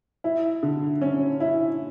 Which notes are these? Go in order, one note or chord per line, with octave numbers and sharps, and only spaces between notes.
E4
D3
C#4
E4